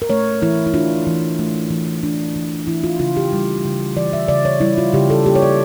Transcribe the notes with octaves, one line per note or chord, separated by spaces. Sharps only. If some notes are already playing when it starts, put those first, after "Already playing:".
A#4
A3 C#5
E3 E4
E4
D4 F4
E3
A3
E3
D4
E3
E3 E4
F4
C#3 F4
G4
G3
C#3
E3 D5
E5
C#3 D5
C#5
G3 E4
F4
C#3 G4
A4
A#3 G4
C#5
D5